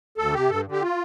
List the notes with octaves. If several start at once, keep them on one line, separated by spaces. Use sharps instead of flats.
D2 A4
C3 G4
G2 A4
D3
G4
F4